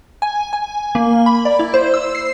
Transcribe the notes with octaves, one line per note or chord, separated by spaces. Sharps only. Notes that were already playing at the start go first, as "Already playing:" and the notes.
G#5
G#5
A#3
B5
D5
E4
C5
E6
C7